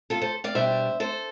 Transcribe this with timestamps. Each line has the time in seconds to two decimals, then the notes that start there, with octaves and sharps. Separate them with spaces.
0.10 F4 A4
0.21 A4 C5
0.44 D5 F5
0.55 B2 G3 D4 C5 E5
1.00 A4 C5